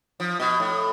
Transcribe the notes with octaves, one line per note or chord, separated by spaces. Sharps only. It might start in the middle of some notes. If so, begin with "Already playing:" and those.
F3
B2
A2